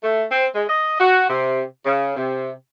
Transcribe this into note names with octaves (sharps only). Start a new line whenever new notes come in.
A3
C4
G#3
D#5
F#4
C3
C#3
C3